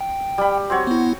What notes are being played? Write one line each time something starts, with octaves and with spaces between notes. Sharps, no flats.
G5
G3 B5
C4 F#4 C#5
B3 E4